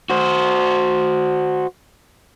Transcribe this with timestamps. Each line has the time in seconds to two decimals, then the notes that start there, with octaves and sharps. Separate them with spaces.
0.10 F#4 C5